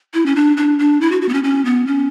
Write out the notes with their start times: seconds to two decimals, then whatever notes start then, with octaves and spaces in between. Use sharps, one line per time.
0.14 E4
0.26 C#4
0.36 D4
0.57 D4
0.79 D4
1.01 E4
1.12 F#4
1.22 F#4
1.29 B3
1.34 C#4
1.44 C#4
1.65 B3
1.87 C#4